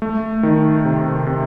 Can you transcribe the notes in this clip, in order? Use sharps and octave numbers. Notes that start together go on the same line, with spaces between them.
A3
D#3
C3
C3